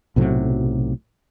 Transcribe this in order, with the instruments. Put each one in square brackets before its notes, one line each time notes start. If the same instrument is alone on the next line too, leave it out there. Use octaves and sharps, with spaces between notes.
[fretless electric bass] B1 A2 C3 F#3